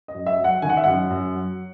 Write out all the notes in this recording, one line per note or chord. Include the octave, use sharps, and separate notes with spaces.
D#5
F#2
E5
F#3
F#5
D#3 G#5
F#5
E5
F#2 F#5
F#2
F#3